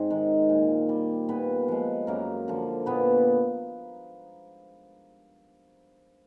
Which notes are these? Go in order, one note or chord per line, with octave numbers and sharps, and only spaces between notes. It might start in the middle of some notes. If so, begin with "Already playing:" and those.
Already playing: G#2 C4 C5
D#3 G#3
A#2
G3
A#2 B3 B4
F3 G#3
F#2 A#3 A#4
D3 F3
A#2 B3 B4